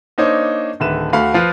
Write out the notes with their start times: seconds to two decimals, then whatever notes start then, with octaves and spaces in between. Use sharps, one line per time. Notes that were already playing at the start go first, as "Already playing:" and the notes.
0.18 A#3 D4 D#4 C5 C#5 D#5
0.80 D1 D3 D#3 B4 E5 E7
1.13 D2 A3 F#4 F5 B5 C#6
1.34 F3 F4 B4